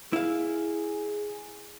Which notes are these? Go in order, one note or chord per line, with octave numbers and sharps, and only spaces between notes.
E4 G#4 F5